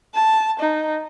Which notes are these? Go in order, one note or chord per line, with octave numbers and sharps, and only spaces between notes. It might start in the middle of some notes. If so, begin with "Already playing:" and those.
A5
D#4